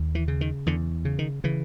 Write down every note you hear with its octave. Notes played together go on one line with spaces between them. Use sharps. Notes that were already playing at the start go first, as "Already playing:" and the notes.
Already playing: D#2
E3
C#3
D#3
E2 D3
C#3
D#3
C#3 E3